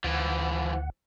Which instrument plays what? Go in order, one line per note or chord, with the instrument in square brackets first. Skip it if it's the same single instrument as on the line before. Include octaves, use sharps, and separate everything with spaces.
[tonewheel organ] D2 F#5 [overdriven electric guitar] E3 F3